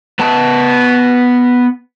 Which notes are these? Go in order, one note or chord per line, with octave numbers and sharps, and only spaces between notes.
B3 A5